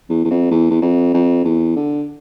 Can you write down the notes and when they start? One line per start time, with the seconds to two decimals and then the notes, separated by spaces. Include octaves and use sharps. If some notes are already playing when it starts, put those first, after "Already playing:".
0.10 E2
0.25 E2
0.31 F2
0.51 E2
0.71 E2
0.82 F2
1.14 F2
1.45 E2
1.76 D3